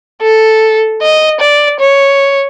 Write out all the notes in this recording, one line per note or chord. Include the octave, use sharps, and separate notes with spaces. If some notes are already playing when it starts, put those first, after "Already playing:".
A4
D#5
D5
C#5